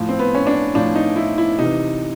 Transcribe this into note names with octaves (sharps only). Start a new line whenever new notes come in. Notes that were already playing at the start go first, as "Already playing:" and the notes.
Already playing: A2 F3
C4
B3
C#4
D4
A2 F3 D4
D#4
E4
E4
C3 E3 D#4